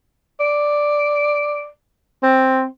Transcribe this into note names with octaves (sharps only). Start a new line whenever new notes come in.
D5
C4